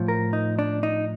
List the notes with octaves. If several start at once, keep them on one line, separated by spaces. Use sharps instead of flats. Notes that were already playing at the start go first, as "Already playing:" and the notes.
Already playing: A2 F3
A#4
D#4
D4
D#4